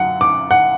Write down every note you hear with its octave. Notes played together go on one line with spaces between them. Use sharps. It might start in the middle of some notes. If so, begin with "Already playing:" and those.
Already playing: F#2 F#3 F#5
D6
F#5